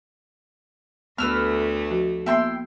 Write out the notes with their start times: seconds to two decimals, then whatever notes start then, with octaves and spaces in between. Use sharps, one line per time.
1.18 D2 A3 B3 B4 E6 F6
1.91 F3 F#4
2.26 A#3 B3 E4 G5 C6